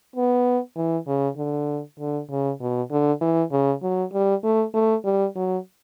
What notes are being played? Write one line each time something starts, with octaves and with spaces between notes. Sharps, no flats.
B3
E3
C#3
D3
D3
C#3
B2
D3
E3
C#3
F#3
G3
A3
A3
G3
F#3